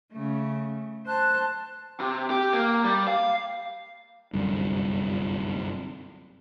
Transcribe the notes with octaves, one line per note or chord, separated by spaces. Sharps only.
C#3 A3
C5 A5 F#6
C3
G4
A#3
G3
F5
G1 C2 F#2